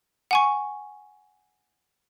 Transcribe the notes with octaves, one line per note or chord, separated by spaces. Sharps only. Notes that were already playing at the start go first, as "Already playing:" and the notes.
F#5 G#5 C#6